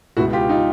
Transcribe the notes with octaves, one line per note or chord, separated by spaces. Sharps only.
C#2 B2 E4 F#4
F4 G4
D#4 F4